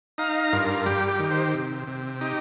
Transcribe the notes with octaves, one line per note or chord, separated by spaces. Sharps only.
D#4 F5 A#5
G2 F4 A#4
G3 G4
G4
D#3
G4 C5
C3
C3
D#4 G4